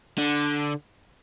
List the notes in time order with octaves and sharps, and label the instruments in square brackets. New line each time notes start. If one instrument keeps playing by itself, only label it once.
[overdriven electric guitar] D3